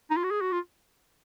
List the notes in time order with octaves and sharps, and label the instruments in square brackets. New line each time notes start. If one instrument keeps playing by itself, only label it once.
[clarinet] D#4
F4
F#4
G#4
F#4
F4